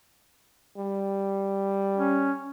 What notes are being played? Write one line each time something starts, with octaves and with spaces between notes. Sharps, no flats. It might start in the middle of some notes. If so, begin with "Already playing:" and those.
G3
C#4